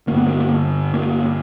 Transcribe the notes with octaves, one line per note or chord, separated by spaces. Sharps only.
G2 D3 A#3
B3
A#3
A#3